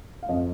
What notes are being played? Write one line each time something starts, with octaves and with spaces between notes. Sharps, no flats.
F5
F2 D#5